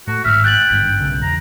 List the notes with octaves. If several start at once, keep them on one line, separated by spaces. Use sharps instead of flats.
A2 F#4
G#1 G#2 E5 F6 B6
G5 F#6 A6 F#7
G#1 G2
B1 C#3
E2 A#5